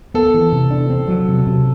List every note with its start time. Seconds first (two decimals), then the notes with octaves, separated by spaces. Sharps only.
0.14 B3 A4
0.34 E3
0.52 C3
0.71 D4
0.90 C4
1.08 F#3
1.28 C3
1.47 C3